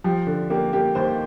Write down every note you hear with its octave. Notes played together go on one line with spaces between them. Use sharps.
F3 G4
D3
A#3 G4
A#3 G4
D#2 C5